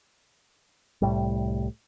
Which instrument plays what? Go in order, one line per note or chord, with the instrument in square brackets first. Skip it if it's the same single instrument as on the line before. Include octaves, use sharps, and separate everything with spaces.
[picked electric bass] C2 A2 G3